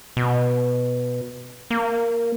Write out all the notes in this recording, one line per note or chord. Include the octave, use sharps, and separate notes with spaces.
B2
A#3